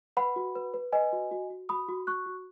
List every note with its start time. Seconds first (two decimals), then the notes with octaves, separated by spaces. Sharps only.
0.17 B4 F#5 B5
0.36 F#4
0.55 B4
0.74 B4
0.92 B4 D#5 G#5
1.13 F#4
1.31 F#4
1.50 F#4
1.69 F#4 B5 D#6
1.88 F#4
2.07 F#4 C#6 F#6
2.26 F#4